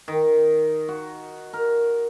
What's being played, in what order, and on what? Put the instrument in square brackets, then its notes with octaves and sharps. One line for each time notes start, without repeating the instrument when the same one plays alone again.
[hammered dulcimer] D#3
F#4
A#4